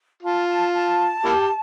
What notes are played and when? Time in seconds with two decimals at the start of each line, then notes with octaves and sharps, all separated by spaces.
0.22 F4 A5
0.48 A5
0.74 A5
1.25 A#3 E4 G4